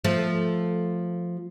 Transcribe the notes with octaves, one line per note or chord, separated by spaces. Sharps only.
F3 A3